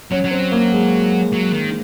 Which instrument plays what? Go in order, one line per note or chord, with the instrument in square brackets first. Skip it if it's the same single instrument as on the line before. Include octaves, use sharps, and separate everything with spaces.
[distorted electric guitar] F#3 [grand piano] C#4
[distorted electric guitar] F#3
[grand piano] C4
A#3
G#3
[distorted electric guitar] F#3
D#3